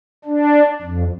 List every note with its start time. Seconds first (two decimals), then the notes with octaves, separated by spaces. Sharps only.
0.25 D4
0.82 F2